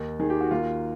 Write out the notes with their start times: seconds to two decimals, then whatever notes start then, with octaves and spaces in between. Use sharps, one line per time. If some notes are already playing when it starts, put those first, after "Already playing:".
Already playing: D#2 D#4
0.20 D#3 G#4
0.30 G4
0.41 F#4
0.51 D#2 F4